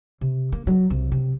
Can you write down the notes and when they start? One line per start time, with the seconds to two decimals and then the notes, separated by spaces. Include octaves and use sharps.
0.21 C3
0.52 A#3
0.67 F#3
0.90 C2
1.12 C3